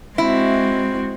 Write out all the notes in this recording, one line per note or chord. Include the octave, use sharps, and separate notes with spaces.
G#3 C4 E4 F#4